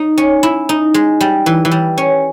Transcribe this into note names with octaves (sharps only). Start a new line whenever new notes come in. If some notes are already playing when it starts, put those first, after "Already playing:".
Already playing: D#4
C#4
E4
D#4
G#3
G3
E3
E3
G3
C#4